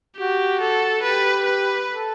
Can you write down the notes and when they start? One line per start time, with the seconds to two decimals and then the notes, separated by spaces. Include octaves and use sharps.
0.18 F#4 G4
0.61 A4
1.03 G4 B4
1.45 B4
1.88 A4